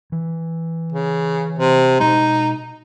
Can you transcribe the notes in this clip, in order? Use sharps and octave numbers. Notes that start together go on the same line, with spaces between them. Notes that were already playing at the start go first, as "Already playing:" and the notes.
E3
C#3
C3
B2 G#3 D#4